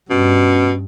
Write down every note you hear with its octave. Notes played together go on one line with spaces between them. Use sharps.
G2 B2 C#4